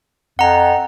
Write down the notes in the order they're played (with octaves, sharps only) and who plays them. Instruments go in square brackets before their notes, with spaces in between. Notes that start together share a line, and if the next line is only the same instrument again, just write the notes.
[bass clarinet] F2 [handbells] F#5 A#5